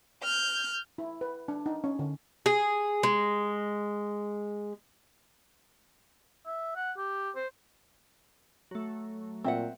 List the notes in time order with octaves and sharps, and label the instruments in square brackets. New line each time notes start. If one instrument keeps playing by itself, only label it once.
[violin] F6 G6
[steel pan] E4
B4
D4
D#4
C#4
D3
[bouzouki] G#4
G#3
[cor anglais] E5
F#5
G4
C5
[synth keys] F#3 A3
[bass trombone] A#2 [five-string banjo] C4 E5 F#5